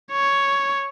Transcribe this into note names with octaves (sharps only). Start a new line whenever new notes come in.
C#5